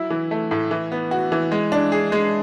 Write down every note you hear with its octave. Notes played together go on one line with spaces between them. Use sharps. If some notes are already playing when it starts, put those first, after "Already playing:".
Already playing: F#3 E4
E3
A3
A2
E3
B3
F#4
E3
G#3
D4
G#4
G#3